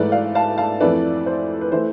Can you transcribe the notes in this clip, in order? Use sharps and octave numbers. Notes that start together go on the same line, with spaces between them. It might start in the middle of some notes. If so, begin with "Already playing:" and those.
Already playing: G#2 E3 A3 B4 D5
D5 F5
F5 A5
F5 A5
F2 E3 A3 B4 D5
C5
B4
E3 A3 C5